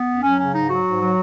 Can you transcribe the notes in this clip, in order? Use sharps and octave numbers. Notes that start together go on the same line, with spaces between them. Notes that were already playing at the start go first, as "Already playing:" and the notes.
Already playing: B3
F#2
F#3 C#4
C#3 C#4
G#2 D#4
F#3 F#4
G#2
F#3